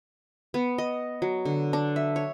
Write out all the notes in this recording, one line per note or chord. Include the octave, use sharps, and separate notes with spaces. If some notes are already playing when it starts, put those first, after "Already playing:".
B3
D#5
F#3
D3
D4
E5
C#5